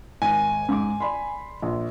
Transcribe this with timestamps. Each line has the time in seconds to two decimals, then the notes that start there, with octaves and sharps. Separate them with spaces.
0.22 G#1 G#5
0.69 G#2 D6
1.00 D5 B5 C6
1.62 A#1